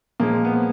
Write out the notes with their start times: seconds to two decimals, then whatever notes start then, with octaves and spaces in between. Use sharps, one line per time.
0.20 A#2 F3 G#3 A#3
0.45 B3